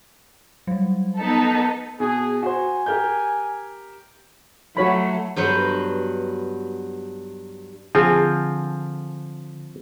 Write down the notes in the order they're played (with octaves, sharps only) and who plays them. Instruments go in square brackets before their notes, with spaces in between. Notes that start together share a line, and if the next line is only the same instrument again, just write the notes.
[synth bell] F#3 G3
[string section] B3 D#4 A4
[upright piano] B2 [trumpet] G#4
[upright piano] F#4 C5 [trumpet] G#5
[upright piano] G4 A#4 G6
[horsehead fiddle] F#3 A3 [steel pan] F#4 C#5 B5
[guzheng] G2 F#3 B3 C5
[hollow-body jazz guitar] D3 [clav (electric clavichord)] F3 C4 F4 [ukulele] G#4